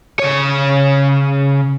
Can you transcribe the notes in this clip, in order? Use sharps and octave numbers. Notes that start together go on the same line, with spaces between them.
C#3 C#5